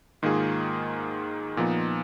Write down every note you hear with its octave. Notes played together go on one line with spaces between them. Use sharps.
G#2 D#3 A#3 F4 G#4
A#2 F3 B3 D#4